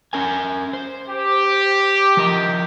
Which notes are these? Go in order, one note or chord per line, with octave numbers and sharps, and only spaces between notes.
C#4 A#4 G#5
C5
G4
F3 A#4 D#5